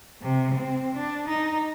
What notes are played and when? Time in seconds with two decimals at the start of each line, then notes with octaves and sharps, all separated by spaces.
0.22 C3
0.55 C4
0.95 D4
1.28 D#4